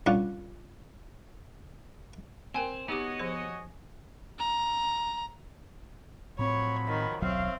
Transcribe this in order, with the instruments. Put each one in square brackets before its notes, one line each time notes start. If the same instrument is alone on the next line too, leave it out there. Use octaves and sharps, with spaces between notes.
[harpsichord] C2 C#4 D4 F4 F#5
[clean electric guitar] C4 [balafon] A#4 G5 C6 [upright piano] G#5
[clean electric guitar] B3 [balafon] D#4 G4 D6 [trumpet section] F#4 C#5 D#5
[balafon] F3 G#4 C5
[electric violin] A#5
[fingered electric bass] A2 C4 [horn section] F3 F#3 B5 [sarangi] C#5
[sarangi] D#3
[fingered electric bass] D#1 B1 F#3 [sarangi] C4 [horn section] C#5 E5 F5